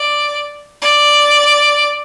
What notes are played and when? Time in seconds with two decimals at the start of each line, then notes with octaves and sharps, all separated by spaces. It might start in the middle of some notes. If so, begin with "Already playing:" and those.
Already playing: D5
0.82 D5